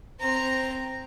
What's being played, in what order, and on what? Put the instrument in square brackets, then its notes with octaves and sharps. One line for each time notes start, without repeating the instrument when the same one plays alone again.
[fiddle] C4 A#5